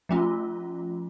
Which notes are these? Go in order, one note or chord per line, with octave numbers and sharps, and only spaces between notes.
F3 A3 C#4 F4